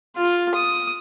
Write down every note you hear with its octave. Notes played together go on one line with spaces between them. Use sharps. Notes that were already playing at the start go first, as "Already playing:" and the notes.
F4
D#6